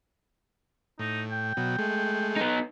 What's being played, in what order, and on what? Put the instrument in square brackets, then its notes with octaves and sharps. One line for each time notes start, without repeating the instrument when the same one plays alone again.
[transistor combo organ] A2 [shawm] D#4
[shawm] G5
[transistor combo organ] B2 F#3
G#3 A3
[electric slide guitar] B3 D#4